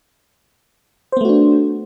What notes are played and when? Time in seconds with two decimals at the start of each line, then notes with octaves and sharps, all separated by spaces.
1.12 C5
1.17 B3
1.21 A3
1.25 F#4
1.29 D4